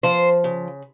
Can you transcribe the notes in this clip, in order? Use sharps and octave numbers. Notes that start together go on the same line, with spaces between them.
F3 C5
C#3